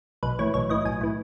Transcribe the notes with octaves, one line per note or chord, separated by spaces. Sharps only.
B1 B4
A2 E3 C#5
B1 C#5
A2 E3 D#5
B1 G#5
A2 E3